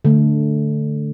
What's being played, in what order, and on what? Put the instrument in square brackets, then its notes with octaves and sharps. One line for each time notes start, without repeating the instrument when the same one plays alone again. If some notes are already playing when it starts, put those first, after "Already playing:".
[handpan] D3 A3